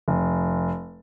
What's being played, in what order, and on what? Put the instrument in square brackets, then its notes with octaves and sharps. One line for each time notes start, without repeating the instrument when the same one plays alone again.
[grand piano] F1